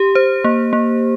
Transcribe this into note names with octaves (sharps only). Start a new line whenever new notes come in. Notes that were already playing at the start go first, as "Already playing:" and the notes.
Already playing: G4
C5
A#3
A#3